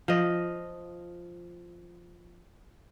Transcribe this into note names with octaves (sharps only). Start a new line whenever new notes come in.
F3 D#5